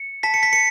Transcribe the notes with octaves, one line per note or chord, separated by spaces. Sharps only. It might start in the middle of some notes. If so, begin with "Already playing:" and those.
Already playing: C#7
A5 B6
C#7
B6
C#7